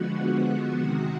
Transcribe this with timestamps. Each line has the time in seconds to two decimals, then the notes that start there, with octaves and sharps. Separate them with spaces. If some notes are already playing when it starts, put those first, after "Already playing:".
Already playing: D3 F3 G#3 B3 F#4 F#5
0.76 C3 D#3 G#3 F#4 F#5